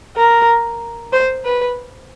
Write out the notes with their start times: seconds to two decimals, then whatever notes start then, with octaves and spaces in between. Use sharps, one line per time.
0.17 A#4
1.13 C5
1.45 B4